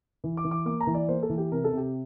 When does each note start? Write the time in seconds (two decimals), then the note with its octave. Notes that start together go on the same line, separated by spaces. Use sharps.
0.24 E3
0.37 D6
0.44 E3
0.51 D6
0.65 A#3 D6
0.81 A#5
0.87 E3
0.95 D5
1.09 A#3 C5
1.23 A4
1.29 E3
1.38 G4
1.52 C3 A#4
1.64 A4
1.73 C3 G4